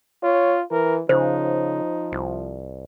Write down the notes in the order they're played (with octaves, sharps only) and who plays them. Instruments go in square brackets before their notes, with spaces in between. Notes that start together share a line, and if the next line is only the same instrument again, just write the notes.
[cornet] F4 [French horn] C#5
[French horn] E3 [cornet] A#4
[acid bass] C#3 [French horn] F3 [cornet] D#4 [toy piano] C5
[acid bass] C2